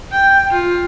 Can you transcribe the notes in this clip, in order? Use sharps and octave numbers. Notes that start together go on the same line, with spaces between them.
G5
F4